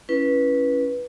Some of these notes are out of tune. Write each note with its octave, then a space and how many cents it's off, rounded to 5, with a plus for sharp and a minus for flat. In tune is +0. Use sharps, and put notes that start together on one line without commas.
C#4 +0 E4 +15 B4 -15